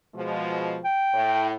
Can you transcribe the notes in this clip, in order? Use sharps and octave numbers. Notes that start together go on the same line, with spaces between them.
B2 F3 G#3
G5
A2